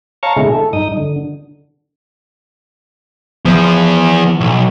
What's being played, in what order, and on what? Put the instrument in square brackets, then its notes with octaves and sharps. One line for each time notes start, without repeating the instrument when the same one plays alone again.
[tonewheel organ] C#5 F5 A5 A#5 C#6
B2 D3 G#3 E4 G#4
A4
G2 D#4 D#6
D3
[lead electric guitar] E3 B3 [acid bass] F3
[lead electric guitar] B1